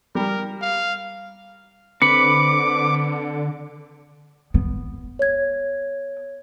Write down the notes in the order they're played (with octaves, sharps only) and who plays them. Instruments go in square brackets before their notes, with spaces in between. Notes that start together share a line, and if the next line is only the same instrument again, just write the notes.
[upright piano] G3 [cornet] A#4
[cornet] F5
[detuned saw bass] D3 [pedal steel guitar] C4 B4 B5 [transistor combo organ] D6 [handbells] C#7
[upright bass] B3
[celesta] C#5 G#6